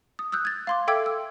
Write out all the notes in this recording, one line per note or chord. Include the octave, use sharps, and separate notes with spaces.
D#6
D#6 E6 F#6 G6
G#6 A6
F5 C6 D6
A4 E5 G5 D6 E6 G#6
E6